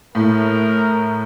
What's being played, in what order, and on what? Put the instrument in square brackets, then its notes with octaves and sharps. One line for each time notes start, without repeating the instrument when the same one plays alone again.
[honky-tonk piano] A2 [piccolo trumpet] A#4